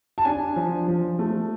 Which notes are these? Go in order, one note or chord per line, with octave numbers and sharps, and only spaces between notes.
A5
D4 G#5
F3
F3
A3